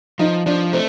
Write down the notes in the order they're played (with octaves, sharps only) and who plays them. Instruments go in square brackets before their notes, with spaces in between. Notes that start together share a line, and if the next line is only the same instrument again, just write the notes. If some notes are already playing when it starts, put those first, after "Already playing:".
[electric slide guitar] F3 [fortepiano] D#4
[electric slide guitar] F3 [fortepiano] D4
[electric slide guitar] A3 [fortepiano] C4